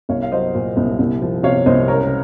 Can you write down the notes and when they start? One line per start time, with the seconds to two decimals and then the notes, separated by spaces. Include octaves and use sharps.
0.09 C2 C#5 F5
0.22 F5
0.32 F#3 C5 D#5
0.55 A#2
0.77 C2
0.99 C2
1.22 F3
1.43 C3 C#5 F5
1.66 C2 C5 D#5
1.88 C#2 A#4 C#5